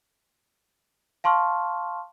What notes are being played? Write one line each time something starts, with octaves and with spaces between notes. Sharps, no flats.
F5 A5 C6 C#6 F6